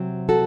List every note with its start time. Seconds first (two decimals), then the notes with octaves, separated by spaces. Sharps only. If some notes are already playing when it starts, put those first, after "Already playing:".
Already playing: C3 F#3 C4
0.29 F#4 A4